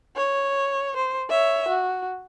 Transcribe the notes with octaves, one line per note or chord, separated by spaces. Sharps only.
C#5
C5
C#5 E5
F#4